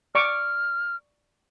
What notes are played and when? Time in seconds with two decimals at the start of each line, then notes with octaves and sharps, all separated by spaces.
0.15 D5 C#6 D6 F6